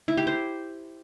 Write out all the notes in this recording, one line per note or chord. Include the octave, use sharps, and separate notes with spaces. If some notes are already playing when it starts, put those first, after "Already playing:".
E4
G4
C5